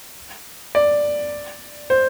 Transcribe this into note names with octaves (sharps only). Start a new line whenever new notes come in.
D5
C5